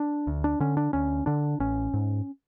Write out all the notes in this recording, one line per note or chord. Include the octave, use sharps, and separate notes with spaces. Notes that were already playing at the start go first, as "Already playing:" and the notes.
Already playing: D4
D2
D4
D3 C#4
D4
D2 C#4
D3 D4
A1 C#4
G#2